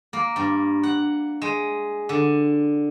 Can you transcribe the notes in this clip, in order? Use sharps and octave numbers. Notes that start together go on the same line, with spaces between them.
A#3
G2
F#5
G#3
D3